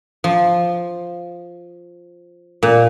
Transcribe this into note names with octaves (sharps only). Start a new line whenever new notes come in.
F3
A#2